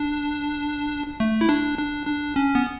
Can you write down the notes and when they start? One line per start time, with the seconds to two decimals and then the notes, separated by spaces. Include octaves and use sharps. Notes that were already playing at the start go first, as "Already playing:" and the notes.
Already playing: D4
1.20 A3
1.41 E4
1.49 D4
1.78 D4
2.07 D4
2.36 C#4
2.55 B3